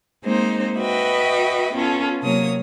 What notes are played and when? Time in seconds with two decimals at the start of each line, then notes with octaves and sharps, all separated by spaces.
0.24 G#3 A#3 C4 D#4 C5
0.77 F#4 B4 D#5 E5 G5
1.73 B3 C#4 F4 A4
2.21 C3 F#3 A#3 C#5 D#6